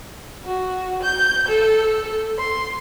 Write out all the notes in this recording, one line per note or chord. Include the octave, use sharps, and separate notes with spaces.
F#4
G6
A4
C6